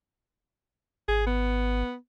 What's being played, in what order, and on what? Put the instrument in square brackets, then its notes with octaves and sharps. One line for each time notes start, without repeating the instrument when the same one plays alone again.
[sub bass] G#1 [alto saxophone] G#4
[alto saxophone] B3